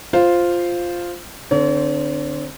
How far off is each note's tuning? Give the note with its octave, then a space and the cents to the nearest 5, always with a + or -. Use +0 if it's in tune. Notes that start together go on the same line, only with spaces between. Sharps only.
F4 +0 C5 +0 F5 +0
D3 +20 C4 +0 C#5 +45